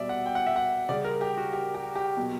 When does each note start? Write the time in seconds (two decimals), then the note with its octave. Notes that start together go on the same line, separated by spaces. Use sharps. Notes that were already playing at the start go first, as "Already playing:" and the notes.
Already playing: B2 G3 D5 E5
0.09 F#5
0.26 G5
0.35 F#5
0.46 E5
0.56 F#5
0.89 C#3 G3 D5
1.05 A#4
1.21 G4
1.38 F#4
1.53 G4
1.75 G4
1.95 G4
2.17 B2 F#3